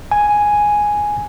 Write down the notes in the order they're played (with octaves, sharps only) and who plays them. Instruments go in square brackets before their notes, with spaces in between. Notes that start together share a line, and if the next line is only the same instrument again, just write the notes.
[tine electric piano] G#5